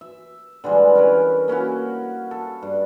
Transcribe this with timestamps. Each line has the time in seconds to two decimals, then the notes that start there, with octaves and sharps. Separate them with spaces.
0.01 E5
0.64 D3 E3 G3 G#3
0.95 C#4 E4 A#4 B4
1.48 A#3 C#4 E4 F#4
2.31 A4
2.62 G2